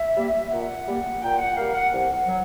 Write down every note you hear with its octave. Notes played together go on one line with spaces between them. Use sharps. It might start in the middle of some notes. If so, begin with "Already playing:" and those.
Already playing: E5
G3 A#3
A#2 F#5
G3 A#3
A#2 G5
F#5
G3 A#3 F5
F#5
C2 F#5
F#3